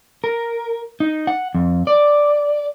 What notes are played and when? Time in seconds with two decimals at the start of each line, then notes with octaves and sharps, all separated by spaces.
0.24 A#4
1.00 D#4
1.27 F#5
1.55 F2
1.87 D5